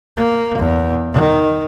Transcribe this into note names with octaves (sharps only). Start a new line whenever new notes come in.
A#3
E2
D#3